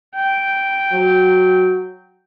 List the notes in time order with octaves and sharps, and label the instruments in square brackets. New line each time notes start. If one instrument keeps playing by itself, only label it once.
[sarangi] G5
[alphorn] F#3